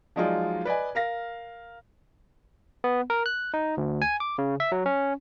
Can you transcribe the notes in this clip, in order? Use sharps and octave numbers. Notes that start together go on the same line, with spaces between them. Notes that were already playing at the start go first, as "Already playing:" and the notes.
F3 F#3 G#3 D#4 F4 D5
B4 D5 D#5 G#5
A#4 F5 A#6
B3
A#4
F#6
D#4
D2
G#5
D6
C#3
E5
F#3
C#4